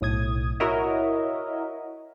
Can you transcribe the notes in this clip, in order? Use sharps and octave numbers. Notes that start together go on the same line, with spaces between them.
B1 A2 D#6 G#6
E4 F#4 A#4 C#5 D#5 E5